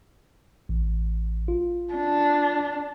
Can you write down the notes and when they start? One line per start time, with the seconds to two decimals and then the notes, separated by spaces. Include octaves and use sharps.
0.69 A1
1.48 F4
1.94 D4